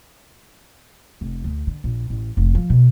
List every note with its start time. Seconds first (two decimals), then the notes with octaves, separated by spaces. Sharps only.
1.21 F1
1.44 D2
1.67 D3
1.84 A#1
2.10 A1
2.37 F1
2.55 F3
2.70 B2